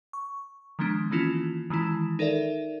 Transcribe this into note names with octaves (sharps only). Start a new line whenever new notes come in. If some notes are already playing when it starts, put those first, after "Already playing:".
C#6
D#3 F3 G#3 B3 D4
D#3 E3 A#3 C#4 E4 F4
D#3 E3 G#3 E4
D#4 A4 A#4 D5 E5